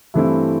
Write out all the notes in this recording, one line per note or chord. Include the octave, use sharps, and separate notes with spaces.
G2 E3 A3 C4 E4